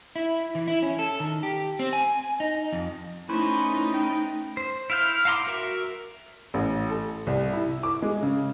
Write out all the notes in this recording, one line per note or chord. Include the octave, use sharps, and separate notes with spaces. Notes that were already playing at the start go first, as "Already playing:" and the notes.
E4
E3
E4
C#4
A4
D#3
G4
C4
G#5
D#4
F2
A3 C#4 D#4 E4 B4 C5
G5
C5
E4 F5 G6
F5 F#5 A#5 C6 D6
F#4 A#4 E5
A1
A4
C2
E4
D6
G#3
C#3